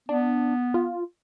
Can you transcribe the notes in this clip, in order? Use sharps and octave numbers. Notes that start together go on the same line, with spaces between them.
B3 D4
F4